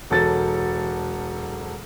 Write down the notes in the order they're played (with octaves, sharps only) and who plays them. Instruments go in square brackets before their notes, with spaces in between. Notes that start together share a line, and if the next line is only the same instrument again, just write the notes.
[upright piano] E1 F#3 A4 A6